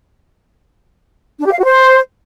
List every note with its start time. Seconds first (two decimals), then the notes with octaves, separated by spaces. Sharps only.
1.40 D4
1.46 G4
1.52 F5
1.58 F#4
1.64 C5